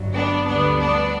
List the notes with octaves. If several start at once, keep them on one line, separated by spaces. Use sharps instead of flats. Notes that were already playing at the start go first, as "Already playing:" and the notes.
Already playing: G1 G2 F#3
B3 D4
D2 D3 G3 B3 D4
B3 D4